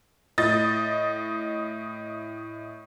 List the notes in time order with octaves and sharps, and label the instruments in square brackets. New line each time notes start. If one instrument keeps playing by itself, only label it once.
[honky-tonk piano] A2 D#5 A6